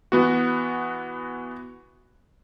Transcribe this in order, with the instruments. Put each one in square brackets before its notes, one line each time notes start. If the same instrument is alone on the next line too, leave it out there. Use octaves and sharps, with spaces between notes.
[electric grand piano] E3 B3 F#4